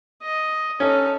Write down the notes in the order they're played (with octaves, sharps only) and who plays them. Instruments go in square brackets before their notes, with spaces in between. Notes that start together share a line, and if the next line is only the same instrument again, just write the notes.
[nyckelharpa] D#5
[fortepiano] C#4 [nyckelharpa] D#4 A4